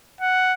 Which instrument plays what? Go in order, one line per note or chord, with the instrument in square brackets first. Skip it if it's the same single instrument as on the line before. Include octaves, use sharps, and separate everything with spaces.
[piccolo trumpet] F#5